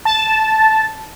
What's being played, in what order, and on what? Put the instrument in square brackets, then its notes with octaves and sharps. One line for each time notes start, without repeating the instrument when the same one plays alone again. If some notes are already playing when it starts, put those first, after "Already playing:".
[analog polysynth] A5